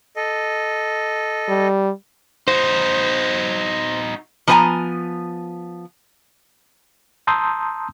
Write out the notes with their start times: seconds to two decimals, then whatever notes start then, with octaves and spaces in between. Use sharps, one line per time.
0.16 A4 D#5
1.48 G3
2.48 D#4 F#4 C5
4.47 F3 B3 B4 C5 G#5 A#5
7.27 A5 A#5 C6 D#6 E6 G6